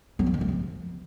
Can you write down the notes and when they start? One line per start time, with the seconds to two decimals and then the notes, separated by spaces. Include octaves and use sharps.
0.19 F#3
0.26 A#3
0.34 D#3
0.41 A3
0.48 F3